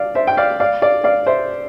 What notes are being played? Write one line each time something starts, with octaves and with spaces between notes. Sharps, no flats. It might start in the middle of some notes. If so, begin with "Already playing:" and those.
Already playing: D5 F5
C5 E5
G5
D5 F5
D5 F5
D5 F5
D5 F5
C5 E5